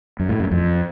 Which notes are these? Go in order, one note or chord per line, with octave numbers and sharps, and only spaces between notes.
F#2
A2
F#2
F2